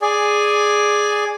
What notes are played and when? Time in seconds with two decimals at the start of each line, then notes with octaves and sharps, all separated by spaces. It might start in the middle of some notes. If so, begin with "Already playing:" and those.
0.02 G#4 D5 G#5